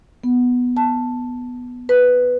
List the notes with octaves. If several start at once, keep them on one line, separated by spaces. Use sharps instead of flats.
B3
A5
B4